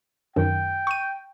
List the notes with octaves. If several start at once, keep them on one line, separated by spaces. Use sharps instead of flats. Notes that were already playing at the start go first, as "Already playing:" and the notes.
F#2 D#3 G5
C#6 D#7